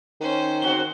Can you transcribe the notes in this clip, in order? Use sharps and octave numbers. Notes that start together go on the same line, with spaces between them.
D#3 C#4 C5
G#2 C4 F#4 G7